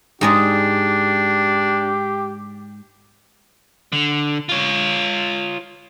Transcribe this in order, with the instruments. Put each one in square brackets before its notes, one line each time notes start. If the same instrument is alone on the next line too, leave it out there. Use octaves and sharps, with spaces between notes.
[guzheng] G#2 G#3 D5 [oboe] D4 [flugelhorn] G4
[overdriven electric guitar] D3
F4 C#5